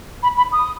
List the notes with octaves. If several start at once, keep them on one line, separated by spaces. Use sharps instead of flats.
B5
B5
D#6